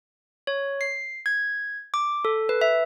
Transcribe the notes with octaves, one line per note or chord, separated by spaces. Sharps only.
C#5
C7
G#6
D6
A4
B4
E5